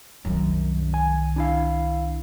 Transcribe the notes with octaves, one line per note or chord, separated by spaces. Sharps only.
C2 F#2 D#3
G#5
D4 E4 F5